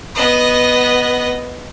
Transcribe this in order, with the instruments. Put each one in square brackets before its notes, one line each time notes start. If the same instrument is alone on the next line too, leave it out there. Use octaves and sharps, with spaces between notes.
[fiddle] B3 D#5